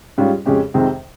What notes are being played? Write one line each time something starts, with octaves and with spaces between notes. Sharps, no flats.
G#2 G3 C#4 F4
F2 C#3 G#3 C#4 G4
F2 C3 D#3 G#3 C4